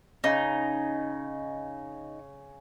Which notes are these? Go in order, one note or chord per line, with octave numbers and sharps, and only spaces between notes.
C#3 D#4